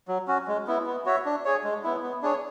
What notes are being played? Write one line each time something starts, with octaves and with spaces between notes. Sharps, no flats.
F#3
C#4 F#4
G#3
B3 E4
B3
F#4 C#5 E5
D4
G#4 C#5
G#3
B3 E4
B3
D4 G#4 C#5